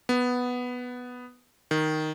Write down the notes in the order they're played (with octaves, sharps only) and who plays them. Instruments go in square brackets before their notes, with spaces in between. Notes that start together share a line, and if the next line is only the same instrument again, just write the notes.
[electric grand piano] B3
D#3